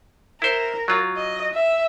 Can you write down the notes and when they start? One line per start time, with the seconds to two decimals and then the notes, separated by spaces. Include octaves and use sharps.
0.42 E4 A#4 C5
0.88 F#3 F4
1.17 D#5
1.54 E5